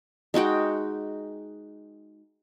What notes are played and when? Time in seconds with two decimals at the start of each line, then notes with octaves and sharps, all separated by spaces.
0.34 G#3 D#4 F#4 G5